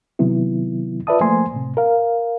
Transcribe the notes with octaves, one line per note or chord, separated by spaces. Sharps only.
C3 D#3 F#3 B3 E4
F4 B4 D5 E5 A5 D#6
F3 A3 A#3 C5 G#5 C6
A2 C3
A#4 F5